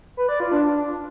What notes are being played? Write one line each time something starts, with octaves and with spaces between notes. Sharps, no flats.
B4
D5
F4
D4